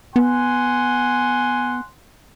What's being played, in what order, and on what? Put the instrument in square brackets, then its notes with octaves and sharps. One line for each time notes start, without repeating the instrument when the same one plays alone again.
[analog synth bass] B3 [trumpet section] F#5 G#5 C6